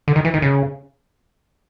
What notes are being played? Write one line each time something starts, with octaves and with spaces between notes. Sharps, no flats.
D3
D#3
E3
D#3
C#3